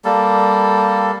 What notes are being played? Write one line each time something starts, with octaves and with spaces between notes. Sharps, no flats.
G3 A#3 A4